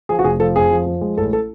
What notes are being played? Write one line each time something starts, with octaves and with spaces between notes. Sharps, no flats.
F3 G#4
F#4
F1 G#4
F3 A4
F2 G#4
F3
F3
G#3
A1 A4
A4